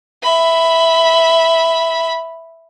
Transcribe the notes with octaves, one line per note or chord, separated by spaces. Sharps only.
E5 B5